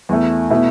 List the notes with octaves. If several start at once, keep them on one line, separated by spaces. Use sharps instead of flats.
E2 E3 A3
B2 A3 E4